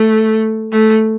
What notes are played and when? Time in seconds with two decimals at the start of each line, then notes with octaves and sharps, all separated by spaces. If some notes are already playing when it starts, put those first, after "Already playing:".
Already playing: A3
0.72 A3